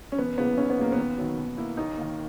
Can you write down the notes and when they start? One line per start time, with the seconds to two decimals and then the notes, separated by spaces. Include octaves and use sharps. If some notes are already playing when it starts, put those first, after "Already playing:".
0.12 C#4
0.18 E1 B3
0.38 E2 C#3 E3 A#3 B3
0.57 B1 C#4
0.70 B3
0.78 A#2 G#3 A#3
0.92 B3
0.97 D#2
1.18 D#3 F#3
1.37 B2
1.57 A#3 E4
1.77 D#2 D#4
1.97 D#3 A#3